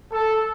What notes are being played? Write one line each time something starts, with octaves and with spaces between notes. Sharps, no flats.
A4